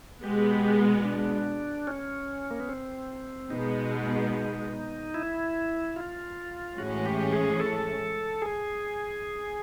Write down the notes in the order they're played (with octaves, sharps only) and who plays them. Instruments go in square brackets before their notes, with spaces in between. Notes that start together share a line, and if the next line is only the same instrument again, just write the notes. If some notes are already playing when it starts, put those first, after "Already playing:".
[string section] B2 G#3 B3 [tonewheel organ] G4
[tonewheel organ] G4
D4
C#4
A#3
B3
C4
[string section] B2 G#3 B3 [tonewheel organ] D#4
[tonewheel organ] E4
F4
[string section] A2 E3 G#3 C#4 [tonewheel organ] F#4
[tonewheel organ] G4
G#4
A4
G#4